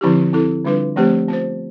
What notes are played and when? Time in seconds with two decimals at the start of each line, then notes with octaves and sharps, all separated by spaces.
0.01 D3 F3 C4 E4 G4
0.33 C4 E4 A4
0.65 D3 G3 D4 F4 B4
0.96 F3 A3 C4 G4 C5
1.28 B3 F4 C5